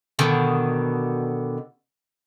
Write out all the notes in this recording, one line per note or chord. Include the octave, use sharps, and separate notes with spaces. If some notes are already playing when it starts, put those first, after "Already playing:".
B2 D3 D#3